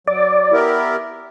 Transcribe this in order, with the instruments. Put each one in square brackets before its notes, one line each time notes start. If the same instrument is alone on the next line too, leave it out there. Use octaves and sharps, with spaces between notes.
[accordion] F#3 [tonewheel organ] D5
[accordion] B3 E4 G4 A#4